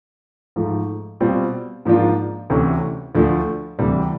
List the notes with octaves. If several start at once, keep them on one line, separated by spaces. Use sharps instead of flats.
G#2 F3 A3
B2 G3 C4 F4
G#2 F3 A#3 D4 F4
D2 C3 E3 A3 C#4
D2 D3 F3 A3
D2 C3 E3 G3